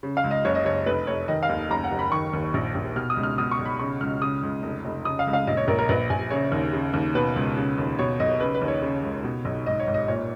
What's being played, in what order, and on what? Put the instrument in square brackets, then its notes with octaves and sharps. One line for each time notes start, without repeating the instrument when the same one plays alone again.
[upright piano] C#3
F5
C#2
D#5
F#1 C#5
D#5
F#1 C#5
F1 B4
F1 C#5
D#3 D#5
F5
D#2
F#1 A#5
F#5
F#1
B5
D#3 C#6
D#2
A#1
A#1
B2 F6
D#6
C#2
F6
B2 D#6
C#6
B1
B5
C#3 C#6
C#2 F6
C#3 D#6
C#2
F1
F1
C#3 D#6
F5
C#2
F5
A#1 D#5
C#5
A#1 A#4
A#4
A#1 B4
A#1 G#5
C#3 C#5
D#2
C#3
D#2
B2 B4
C#2
C#3
D#2
B2 C#5
B1 D#5
C#3 B4
B4
D#2
C#5
C#3
C#2
B2
B1
G#1 D#5
C#5
G#1
D#5
A#2 C#5